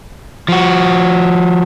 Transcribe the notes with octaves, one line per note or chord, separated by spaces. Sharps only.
F3 F#4